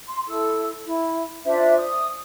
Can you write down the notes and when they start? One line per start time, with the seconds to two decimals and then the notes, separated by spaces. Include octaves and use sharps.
0.07 C6
0.28 E4 A4 E6
0.84 E4
1.45 D4 F4 C5 E5
1.79 D#6